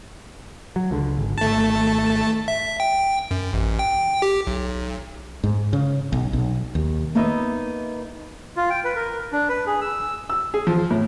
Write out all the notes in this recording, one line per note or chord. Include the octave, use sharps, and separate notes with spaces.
F#3
C#2 D3
G#1
G#1 A3 A5
E5
G5
F#2
A1
G5
G4
B1
G#2
C#3
B1
B1
D#2
A#3 B3 D#4 D#5 E5
F4
G5
B4
A#4
D4
B4
G#4
E6
E6
G#4
F3
A2